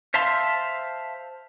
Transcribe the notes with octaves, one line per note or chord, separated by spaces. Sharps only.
C5 E5 F5 A5 C6